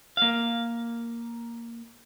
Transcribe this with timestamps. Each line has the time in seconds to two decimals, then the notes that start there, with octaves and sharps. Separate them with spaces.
0.17 A#3 F5